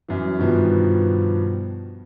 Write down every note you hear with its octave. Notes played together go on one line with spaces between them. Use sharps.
F#2 E3
G2 B2 D#3 F3 B3